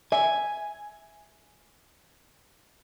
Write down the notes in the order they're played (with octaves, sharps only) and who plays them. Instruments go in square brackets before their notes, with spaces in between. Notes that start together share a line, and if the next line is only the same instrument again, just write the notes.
[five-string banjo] E5 [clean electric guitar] G#5